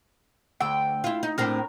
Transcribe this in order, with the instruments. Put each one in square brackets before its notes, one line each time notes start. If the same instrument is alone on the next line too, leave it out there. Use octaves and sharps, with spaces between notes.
[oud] D2 [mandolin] G5 E6
[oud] E4 F4
D#4
[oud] A2 C4 D4 [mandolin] A#4